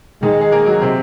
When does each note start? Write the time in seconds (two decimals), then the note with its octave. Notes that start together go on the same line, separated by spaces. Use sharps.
0.22 D#3 G#3 D#4
0.41 G#4
0.52 A#3 A#4
0.66 F#3 F#4
0.81 C3 C4